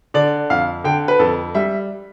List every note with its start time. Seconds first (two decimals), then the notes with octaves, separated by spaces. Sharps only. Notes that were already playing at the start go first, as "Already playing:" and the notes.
0.14 D3 D5
0.50 F2 F5
0.84 D3 G5
1.08 B4
1.19 F2 A4
1.55 G3 E5